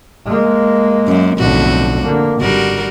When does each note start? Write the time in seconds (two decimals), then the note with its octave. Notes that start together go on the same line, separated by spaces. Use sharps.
0.26 G#3 A#3
1.07 F#2
1.38 B1 F2 A2 D3 F#4
2.04 D3 A#3
2.41 G#1 D3 G3 F#4 A#4